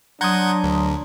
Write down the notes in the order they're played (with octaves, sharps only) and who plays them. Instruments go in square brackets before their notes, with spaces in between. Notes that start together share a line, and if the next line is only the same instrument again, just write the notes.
[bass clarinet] F#3 [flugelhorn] D4 [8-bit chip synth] F#5 G6 G#6 [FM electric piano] A#5 C6 D#6
[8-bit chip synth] D2